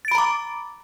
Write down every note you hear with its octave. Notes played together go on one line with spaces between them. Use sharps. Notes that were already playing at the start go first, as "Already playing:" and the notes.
A#5 B5 D6 A6 D7